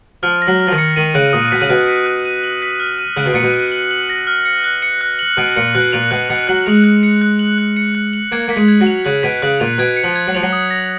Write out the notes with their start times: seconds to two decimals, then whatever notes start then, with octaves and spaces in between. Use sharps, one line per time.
0.23 F3 F6
0.42 A#6
0.47 F#3
0.60 F6
0.67 F3
0.72 D#3
0.78 C#7
0.96 D#3 D#7
1.15 C#3 F#6
1.33 A#2 D#6
1.52 B2 B6
1.61 C#3
1.70 B2 F#6
1.89 B6
2.06 F#6
2.25 D#7
2.43 F#7
2.62 B6
2.80 F6
2.99 D#7
3.17 C#3 F#6
3.26 B2
3.33 A#2 C#7
3.43 B2
3.53 F#6
3.72 F#7
3.91 F#7
4.10 A#6
4.27 F6
4.45 C#7
4.64 F#6
4.82 C#7
5.01 F#6
5.19 F#7
5.37 B2 F#6
5.56 A#2 C#7
5.75 B2 F#6
5.93 A#2 F7
6.11 B2 F#6
6.30 B2 C#7
6.47 F#3 F#6
6.66 G#3 F7
6.84 F#6
7.03 C#7
7.22 F#6
7.39 F#7
7.58 F#6
7.76 C#7
7.95 F#6
8.13 F#7
8.32 A#3 G#6
8.48 A#3 B6
8.56 G#3
8.68 G#6
8.81 F#3
8.87 F7
9.05 C#3 F#6
9.23 B2 B6
9.42 C#3 F#6
9.60 A#2 F7
9.78 B2 G#6
9.97 C#7
10.04 F3
10.16 G#6
10.27 F#3
10.35 F3 F7
10.42 F#3
10.53 D#6
10.71 A#6